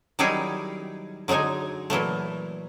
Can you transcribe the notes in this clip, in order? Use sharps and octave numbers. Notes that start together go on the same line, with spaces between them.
D#3 F#3 G3 D#4 E4 G#4
D3 F#3 G#3 D#4 G#5
A#2 E3 F#3 A3